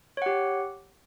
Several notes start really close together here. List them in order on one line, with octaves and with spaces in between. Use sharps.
C#5 F#5 G4